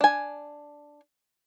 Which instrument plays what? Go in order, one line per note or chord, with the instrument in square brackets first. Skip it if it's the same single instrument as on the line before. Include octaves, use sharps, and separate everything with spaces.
[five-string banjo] D4 G#5